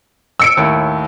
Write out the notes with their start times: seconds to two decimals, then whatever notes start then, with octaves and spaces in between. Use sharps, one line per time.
0.40 E6 C#7 D7
0.57 D#2 A2 E4